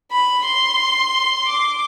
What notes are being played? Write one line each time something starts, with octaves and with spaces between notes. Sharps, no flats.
B5
C6
D6